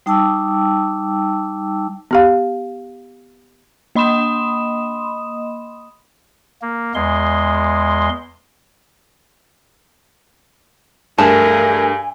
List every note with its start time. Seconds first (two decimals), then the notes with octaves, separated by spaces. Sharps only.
0.06 G3 D#4 G5 A5 D6 E6
2.11 B3 G4 F5
3.95 A#3 D#5 B5 C6 D#6 E7
6.62 A#3
6.95 E2 G#3 C6
11.18 G2 A3 G#4 A#4 G#5 A5